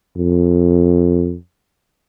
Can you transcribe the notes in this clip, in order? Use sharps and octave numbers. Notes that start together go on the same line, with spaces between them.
F2